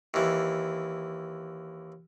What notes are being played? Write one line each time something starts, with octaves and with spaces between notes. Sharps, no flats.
D#2 E3